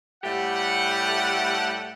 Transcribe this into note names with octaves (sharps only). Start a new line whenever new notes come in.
A2 G3 A3 G4 F#5